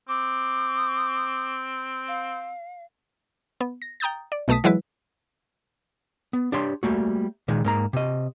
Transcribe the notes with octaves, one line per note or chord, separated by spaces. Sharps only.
C4 D6
F5
B3
A#6
G5 A#5 D#6 G6 A6
D5
B1 B2 A3 A5 D#6 B6
E3 F#3 G#3 E4 B4
B3
D4 G4 C#5 C6
G3 A3 A#3 F#4
A#2 D#3 G#3
G#2 A#3 A#5
C3 D#5